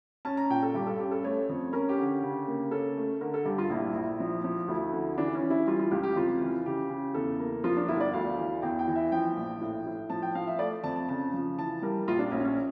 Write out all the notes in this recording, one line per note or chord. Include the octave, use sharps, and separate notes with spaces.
C#4 A5
A#5
A#2 G5
A4
G2 G4
A4
C#4 G4
A4
A3 C#5
F2
C#4 A#4
G4
D3
G4
C#3
A#3
C#4 A4
A3
D3 A#4
A4
G2 G4
F4
A#1 E4
A#1
F3
F3
D2 E4
D3
E3 D4
C#4
E3
E4
G3 F4
F4
C#2 G4
G4
F2 F4
E3
C#3 G4
C#3
E2 A4
A#3
F3 F4
D4
G1 E4
D5
D2 F5
E3
E2 G5
G5
E3
E5
F3 G5
A#1
A2
A2
F3 A5
G5
F3 F5
E5
A3 D5
F2 A5
A5
C#3 A5
F3
E3 A5
G3 A#4
A#1 F4
D4
A#1 C#4
C#4